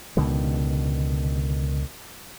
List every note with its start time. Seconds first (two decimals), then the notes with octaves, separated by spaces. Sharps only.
0.17 C#2 B2 D3 D#3